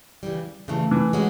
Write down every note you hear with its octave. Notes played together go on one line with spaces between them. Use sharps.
C#3 E3 G3
C#3 E3 G3 A3
E3
G#3 C#4 F#4